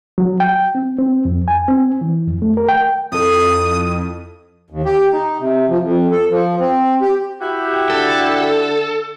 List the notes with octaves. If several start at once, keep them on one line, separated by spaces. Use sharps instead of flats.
F#3
G5
C4
C4
F2
G#5
C4
E3
F2
A3
A#4
G5
F2 E4 A4 D#6
D#2
G4
D#4
C3
F3
F2
A4
F3
C4
G4
E4 F#4 G4
D3 A4